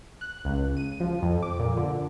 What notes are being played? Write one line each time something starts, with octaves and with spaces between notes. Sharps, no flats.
F#6
C#2
D#7
F3
F2
D6
A#2
D3